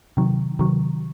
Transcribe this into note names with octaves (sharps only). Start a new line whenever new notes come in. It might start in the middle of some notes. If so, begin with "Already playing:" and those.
C3 D#3 F#3
C3 D#3 F#3